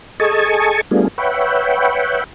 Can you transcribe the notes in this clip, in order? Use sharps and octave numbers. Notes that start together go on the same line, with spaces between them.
G#4 A4 D#5 G#5 A5 C#6
G3 A3 B3 D4 F4 G#4
B4 C#5 E5 F#5 G5